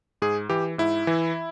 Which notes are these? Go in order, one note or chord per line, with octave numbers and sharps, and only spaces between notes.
G#2 G#4
E3 G4
G#2 E4
E3